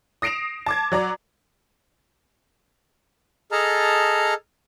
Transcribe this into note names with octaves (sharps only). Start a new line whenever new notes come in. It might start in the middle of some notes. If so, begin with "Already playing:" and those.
D#6 A#6 C7 D7 E7 F7
A5 D6 G#6
F#3 D5 A#5 D6
G#4 A4 D#5 A5 A#5 F6